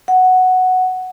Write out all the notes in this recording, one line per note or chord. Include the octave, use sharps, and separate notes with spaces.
F#5